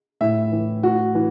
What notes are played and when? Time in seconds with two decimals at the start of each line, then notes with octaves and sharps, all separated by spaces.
0.21 A2 E5
0.52 E3
0.83 A2 F#4
1.15 E3